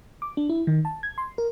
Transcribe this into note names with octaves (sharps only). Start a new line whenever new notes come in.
D6
D4
E4
D#3
A5
G#6
C6
A#4